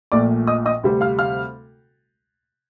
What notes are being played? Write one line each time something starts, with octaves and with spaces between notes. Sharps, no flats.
A#1 A#2 A3 D5 D6
D#5 D#6
D#5 D#6
D2 C3 G3 C4
F5 F6
F5 F6